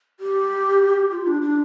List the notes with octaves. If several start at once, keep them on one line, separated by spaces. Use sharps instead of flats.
G4
F4
D4
D4